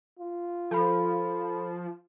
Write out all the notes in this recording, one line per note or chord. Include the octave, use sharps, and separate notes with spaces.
F4
F3 A4 B5